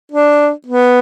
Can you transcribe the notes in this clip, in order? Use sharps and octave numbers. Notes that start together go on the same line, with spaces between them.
D4
B3